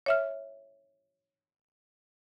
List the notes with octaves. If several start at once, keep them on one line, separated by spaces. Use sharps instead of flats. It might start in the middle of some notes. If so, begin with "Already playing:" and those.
C#5 E5 F6